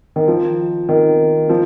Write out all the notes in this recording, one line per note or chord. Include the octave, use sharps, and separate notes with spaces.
D#3
F3
D#3
F3